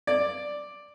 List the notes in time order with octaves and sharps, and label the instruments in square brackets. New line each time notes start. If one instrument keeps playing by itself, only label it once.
[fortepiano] D5